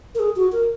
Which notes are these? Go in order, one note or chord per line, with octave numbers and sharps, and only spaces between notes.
A#4
G#4
F#4
A#4